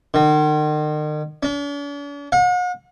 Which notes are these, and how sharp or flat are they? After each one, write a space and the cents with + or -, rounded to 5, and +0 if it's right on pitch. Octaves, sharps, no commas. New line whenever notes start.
D#3 -40
D4 -45
F#5 -45